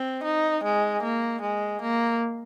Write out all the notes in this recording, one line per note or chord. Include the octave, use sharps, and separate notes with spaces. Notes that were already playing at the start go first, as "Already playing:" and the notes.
Already playing: C4
D#4
G#3
A#3
G#3
A#3